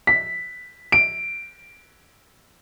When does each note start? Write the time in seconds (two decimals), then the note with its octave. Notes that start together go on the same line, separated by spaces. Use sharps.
0.07 B6
0.92 D7